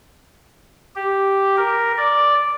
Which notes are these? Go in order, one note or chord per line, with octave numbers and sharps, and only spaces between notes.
G4
A#4
D5